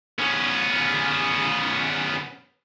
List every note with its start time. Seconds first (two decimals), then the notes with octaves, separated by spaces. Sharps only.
0.19 B3 C#4